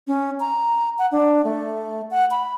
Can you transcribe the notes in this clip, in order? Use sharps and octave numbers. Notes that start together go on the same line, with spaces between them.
C#4
A#5
F#5
D4
A3
F#5
B5